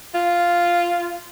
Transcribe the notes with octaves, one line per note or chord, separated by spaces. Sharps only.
F4